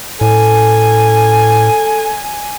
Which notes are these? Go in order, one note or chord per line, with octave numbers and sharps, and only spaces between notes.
A2 A4 G#5